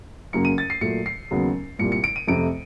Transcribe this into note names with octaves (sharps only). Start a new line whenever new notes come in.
F#2 C#3 F#3 A#3 C#7
D#7
A6
C7
A#2 F#3 A3 C#7
C7
D#2 C#3 F#3 B3
C2 A#2 G3 C#7
C#7
D7
D#7
F2 C3 F3 A3 D7